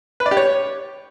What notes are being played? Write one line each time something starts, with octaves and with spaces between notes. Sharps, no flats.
B4
D5
G4
C#5